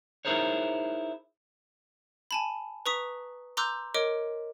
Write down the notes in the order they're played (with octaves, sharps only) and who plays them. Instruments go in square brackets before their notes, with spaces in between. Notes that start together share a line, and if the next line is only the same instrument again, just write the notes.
[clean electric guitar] D#4 E4 G#4 A#4 C5 C#5
[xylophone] G#5 A5 B5
B4 A#5 C#6 D#6 B6
A#5 C6 D6 E6 F#6 G6
A#4 C#5 D#5 D6 D7